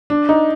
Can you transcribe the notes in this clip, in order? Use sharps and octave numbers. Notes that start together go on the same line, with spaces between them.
D4
D#4